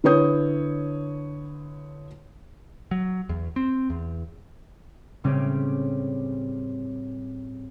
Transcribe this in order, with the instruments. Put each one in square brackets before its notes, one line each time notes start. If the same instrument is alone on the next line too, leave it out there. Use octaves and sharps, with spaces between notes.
[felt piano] D3 E4 B4 C#5 D#6 G6
[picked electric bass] F#3
E2
C4
E2
[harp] A2 C#3 G3 C4 C#4 G4